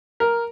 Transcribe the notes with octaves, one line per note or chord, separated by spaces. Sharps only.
A#4